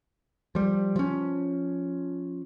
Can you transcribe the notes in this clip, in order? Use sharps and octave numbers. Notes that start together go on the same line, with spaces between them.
F3 G3
F3 C#4